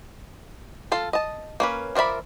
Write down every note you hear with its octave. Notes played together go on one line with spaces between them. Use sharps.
F4 A4 F5
D#5 A5
A#3 C#4 B4
F3 A#4 D5 E5 B5